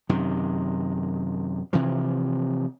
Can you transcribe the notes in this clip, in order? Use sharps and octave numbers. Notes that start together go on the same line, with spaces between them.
F#2 C3 D#3
C3 E3 F3